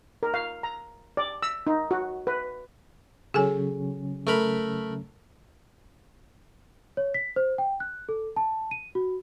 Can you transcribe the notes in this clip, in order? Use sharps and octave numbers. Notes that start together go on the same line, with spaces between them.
A#4
F5
A#5
D5
E6
D#4
F#4
B4
C#3 F#3 C#4 G#4 A4 G#5
A3 A#4 B5
C#5
B6
C5
G5
F#6
A4
A5
D#7
F#4